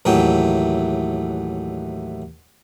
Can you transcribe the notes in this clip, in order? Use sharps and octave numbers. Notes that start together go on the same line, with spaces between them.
D#2 A2 E3 F#3 G5